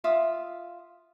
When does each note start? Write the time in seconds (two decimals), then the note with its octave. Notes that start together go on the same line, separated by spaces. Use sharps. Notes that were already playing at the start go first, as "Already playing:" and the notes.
0.04 F4 E5 F5 D#6